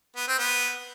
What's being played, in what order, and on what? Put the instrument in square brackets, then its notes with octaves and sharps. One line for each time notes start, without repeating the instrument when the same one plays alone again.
[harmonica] B3
C4
B3